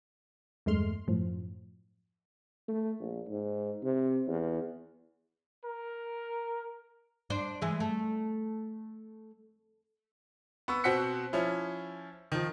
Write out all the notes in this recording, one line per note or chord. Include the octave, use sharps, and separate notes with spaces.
E2 G2 G#3 A3 C6 F6
F#2 A2 F3
A3
A#1
G#2
C3
E2
A#4
D4 C5
E3 G#3
A3
B3 C#6 E6
B2 C4 F#5 F#6 B6 C#7
F3 C#4 E4
D#3 F3